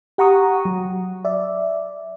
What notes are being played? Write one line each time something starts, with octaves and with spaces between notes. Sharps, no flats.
G4 F#5 A#5 C#6 D#6
F#3
D5 E5